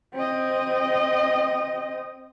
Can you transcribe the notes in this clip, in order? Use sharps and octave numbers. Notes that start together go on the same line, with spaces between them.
C4 D#5